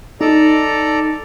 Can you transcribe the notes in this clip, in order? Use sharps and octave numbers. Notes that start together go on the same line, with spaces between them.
D#4 A4 D5 A#5